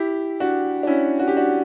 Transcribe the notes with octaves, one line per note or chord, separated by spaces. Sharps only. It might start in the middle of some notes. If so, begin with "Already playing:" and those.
Already playing: E4 G4
D4 F#4
D4
C#4 E4
F#4
G4
D4 F#4